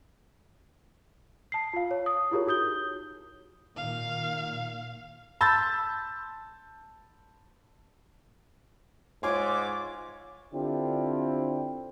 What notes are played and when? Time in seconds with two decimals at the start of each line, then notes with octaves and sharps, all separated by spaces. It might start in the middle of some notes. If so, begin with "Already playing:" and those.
1.52 A5 C7
1.73 F4 F5
1.91 C#5
2.06 D#6
2.31 E4 F4 G4 G#4 A#4 C#5
2.47 D#4 F#4 D#6 G6 G7
3.77 A#2 D#3 F5
5.41 A5 B5 C6 E6 G6 A6
9.23 G#2 F4 C#5 G#5 C6 D6
10.52 D3 C4 D4 E4 F4 G4